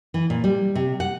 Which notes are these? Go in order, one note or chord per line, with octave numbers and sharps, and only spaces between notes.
E3
A#2
G3
C3
F#5